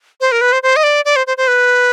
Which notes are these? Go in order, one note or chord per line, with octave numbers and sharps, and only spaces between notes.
C5
A#4
B4
C5
C5
D#5
D5
D5
C5
C5
C5
B4